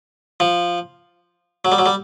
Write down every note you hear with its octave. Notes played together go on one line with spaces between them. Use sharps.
F3
F#3
G3
F#3
G3